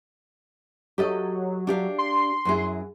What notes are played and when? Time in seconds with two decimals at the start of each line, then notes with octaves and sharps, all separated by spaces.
0.98 F#3 G4 A4 D#5
1.67 D4 G4 F5
1.98 C6
2.45 F#2 E4 G#4